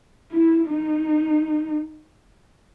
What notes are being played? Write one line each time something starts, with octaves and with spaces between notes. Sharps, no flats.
E4
D#4